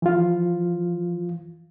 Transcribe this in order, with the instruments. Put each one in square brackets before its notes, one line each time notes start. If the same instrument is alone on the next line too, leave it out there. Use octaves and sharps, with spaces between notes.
[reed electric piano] E3 F3 F4